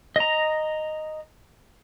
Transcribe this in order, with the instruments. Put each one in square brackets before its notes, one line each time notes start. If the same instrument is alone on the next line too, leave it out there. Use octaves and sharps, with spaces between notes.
[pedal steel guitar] D#5 A#5